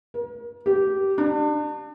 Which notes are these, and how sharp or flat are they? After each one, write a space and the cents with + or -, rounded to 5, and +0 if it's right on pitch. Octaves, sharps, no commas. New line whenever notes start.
A#4 +30
G4 -15
D4 +35